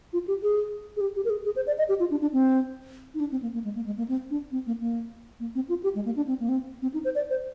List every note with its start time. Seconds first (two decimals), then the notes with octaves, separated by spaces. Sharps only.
0.13 F4
0.28 G4
0.43 G#4
0.97 G#4
1.01 G4
1.16 G4
1.25 A#4
1.30 G#4
1.45 G#4
1.56 C5
1.67 D5
1.78 D#5
1.89 G4
2.00 F4
2.11 D4
2.22 D4
2.33 C4
3.14 D#4
3.20 D4
3.32 C4
3.42 A#3
3.54 A#3
3.64 G#3
3.75 A#3
3.86 G#3
3.98 A#3
4.08 C4
4.31 D4
4.52 C4
4.67 A#3
4.81 A#3
5.40 A#3
5.55 C4
5.69 F4
5.83 G4
5.95 G#3
6.05 A#3
6.16 D4
6.27 C4
6.40 A#3
6.49 C4
6.82 C4
6.94 D#4
7.04 C5
7.15 D5
7.30 C5